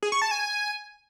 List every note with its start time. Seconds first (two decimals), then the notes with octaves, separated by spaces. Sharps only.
0.03 G#4
0.12 C#6
0.22 A5
0.31 G#5